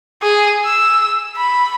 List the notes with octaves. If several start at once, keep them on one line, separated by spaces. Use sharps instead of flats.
G#4
E6
B5